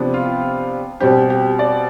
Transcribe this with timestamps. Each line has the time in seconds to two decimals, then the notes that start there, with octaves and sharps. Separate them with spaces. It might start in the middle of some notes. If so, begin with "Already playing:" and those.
Already playing: C3 F3 B3 D4
0.14 F4
1.00 B2 G3 C4 G4
1.30 G4
1.59 D5